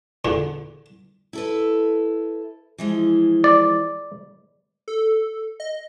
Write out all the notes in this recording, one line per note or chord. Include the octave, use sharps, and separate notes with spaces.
E2 A#2 D3
E4 A4 B4
E3 F3 G#3
D5
A4
D#5